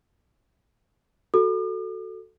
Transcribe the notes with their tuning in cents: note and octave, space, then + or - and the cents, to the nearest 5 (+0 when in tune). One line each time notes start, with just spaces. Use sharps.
F#4 +0 A4 +0 D6 +45